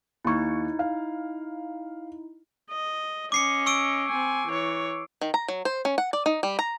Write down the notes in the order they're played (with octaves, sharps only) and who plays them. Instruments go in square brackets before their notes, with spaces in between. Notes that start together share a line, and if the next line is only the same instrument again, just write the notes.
[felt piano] D#2 C#6 [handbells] D#4 E4
[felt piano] F5
[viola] D#5
[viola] C#4 D#5 [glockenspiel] D6 C7 C#7
[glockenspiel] C#6 E6 D7
[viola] C4 G#5
E3 C#5
[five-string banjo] D#3
A#5
F#3
C5
C#4
F#5
D5
D#4
G3
A#5